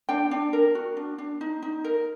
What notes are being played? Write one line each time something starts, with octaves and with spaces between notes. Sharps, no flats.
D4 G5
D4
A#4
F#4
D4
D4
D#4
D#4
A#4